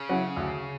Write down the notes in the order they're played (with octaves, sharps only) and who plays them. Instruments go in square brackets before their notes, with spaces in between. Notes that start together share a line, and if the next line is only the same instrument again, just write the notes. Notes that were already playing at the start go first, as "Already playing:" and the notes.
Already playing: [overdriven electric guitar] C#3
[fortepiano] F#3 C#4 E4
D2